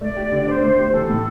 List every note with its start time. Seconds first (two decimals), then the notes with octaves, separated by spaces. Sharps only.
0.01 A3 D5
0.16 G4
0.32 D3
0.47 D4 C5
0.63 A3
0.78 G4
0.93 E3 A4
1.10 A2